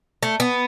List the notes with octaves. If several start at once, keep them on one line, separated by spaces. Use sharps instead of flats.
A3
B3